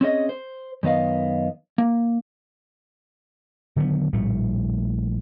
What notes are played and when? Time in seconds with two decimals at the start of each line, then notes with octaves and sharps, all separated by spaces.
0.01 C4 C#4 G#4 D#5
0.29 C5
0.83 F#2 D#3 B3 D#5 F5
1.78 A#3
3.76 D3 D#3 F#3 B3
4.13 A#1 A2 G3 A3